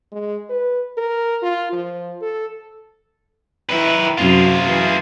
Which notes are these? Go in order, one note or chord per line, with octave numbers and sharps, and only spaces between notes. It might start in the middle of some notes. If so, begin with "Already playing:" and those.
G#3
B4
A#4
F4
F3
A4
D#3 E4 B4
F#2 C3 F4 G#4
E3